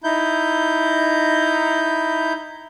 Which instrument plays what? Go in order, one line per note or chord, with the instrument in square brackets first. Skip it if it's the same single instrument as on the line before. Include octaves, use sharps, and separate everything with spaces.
[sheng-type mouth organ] D#4 E4 G6